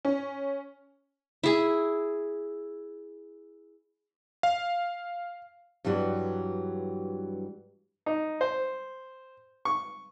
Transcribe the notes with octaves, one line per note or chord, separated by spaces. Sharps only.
C#4
E4 G#4
F5
G2 E3 F#3 G3
D#4
C5
C#6